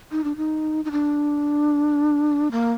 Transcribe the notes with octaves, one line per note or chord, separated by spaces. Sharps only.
D#4
D4
D#4
D#4
D4
A#3